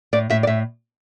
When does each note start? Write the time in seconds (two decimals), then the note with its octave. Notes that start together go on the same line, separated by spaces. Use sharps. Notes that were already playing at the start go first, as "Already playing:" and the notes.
0.13 A2 D5
0.30 A2 E5
0.43 D5
0.47 A2 E5